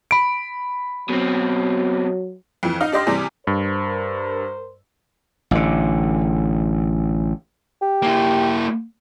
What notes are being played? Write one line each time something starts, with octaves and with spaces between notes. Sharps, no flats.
B5 D7
B2 F#3 C4
F2 E3
D#4 F5 F6
D4 G4 D#5 C6
C3 E3 G3 G#4
G2 A#4 C5
A1 D3
G4
A#3 E4